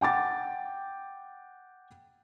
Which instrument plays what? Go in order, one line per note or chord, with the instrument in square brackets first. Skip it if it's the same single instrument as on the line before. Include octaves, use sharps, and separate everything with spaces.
[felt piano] F#5 G5 D6 A6